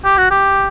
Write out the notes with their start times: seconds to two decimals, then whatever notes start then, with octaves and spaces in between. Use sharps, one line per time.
0.04 G4
0.18 F#4
0.31 G4